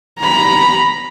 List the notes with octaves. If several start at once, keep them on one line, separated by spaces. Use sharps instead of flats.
A#5 B5